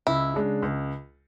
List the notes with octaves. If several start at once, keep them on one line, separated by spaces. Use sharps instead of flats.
C#2 E4
C#3 G#3 D4
C#2